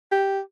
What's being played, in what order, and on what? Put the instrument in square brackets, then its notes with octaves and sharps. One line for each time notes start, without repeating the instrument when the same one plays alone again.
[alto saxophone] G4